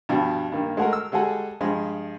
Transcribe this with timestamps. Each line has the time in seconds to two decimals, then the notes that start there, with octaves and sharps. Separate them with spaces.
0.09 G2 B2 F3
0.52 G2 D#3 A#3
0.77 G#3 A3 F#4 A4 A#4
0.93 E6
1.12 G3 G#3 F#4 G#4 A4
1.61 G2 F3 G#3